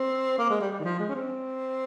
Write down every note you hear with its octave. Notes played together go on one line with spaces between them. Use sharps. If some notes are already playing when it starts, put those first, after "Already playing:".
Already playing: C4
A#3
G#3
G3
G3
D#3
F3
G#3
C#4
C4